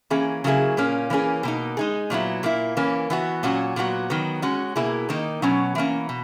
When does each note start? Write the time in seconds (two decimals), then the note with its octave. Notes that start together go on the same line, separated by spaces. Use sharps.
0.10 E3 A#3 C#4 G#4
0.44 C#3 F#3 A#3 E4 G#4
0.77 A#2 A#3 C#4
1.10 E3 A#3 C#4 G#4
1.43 B2 A#3 D#4
1.77 G#3 D#4 G#4
2.10 A#2 F#3 B3 E4
2.43 A#2 A#3 E4
2.77 E3 A#3 C#4
3.10 E3 B3 F#4
3.43 A#2 F#3 C#4 F#4
3.76 A#2 F#3 B3 F#4
4.10 D#3 F#3 B3
4.42 G#3 C#4 F#4
4.76 B2 A#3 E4 G#4
5.09 D#3 A#3 D#4
5.42 B2 F#3 C#4
5.75 E3 A#3 C#4
6.09 B2